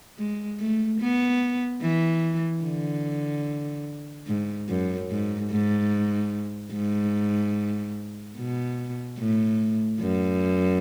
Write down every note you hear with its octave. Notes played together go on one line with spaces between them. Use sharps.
G#3
A3
B3
E3
D3
G#2
F#2
G#2
G#2
G#2
B2
A2
F#2